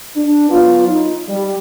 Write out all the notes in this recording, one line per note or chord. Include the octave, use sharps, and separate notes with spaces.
D4
F#3 B3 F4
D#4
G3